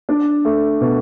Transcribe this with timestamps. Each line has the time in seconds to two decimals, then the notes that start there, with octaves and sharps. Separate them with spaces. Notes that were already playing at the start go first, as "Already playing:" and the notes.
0.09 D4
0.45 A3
0.81 B2